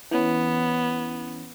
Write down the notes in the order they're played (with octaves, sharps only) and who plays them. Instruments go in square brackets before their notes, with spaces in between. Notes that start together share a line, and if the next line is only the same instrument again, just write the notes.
[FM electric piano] E3 C#4 [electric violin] B3